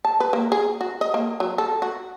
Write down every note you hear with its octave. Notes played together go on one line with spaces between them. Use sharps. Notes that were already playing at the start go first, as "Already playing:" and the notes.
A5
B4
A#3
G#4
F#4
D#5
A#3
F#3
A4
F#4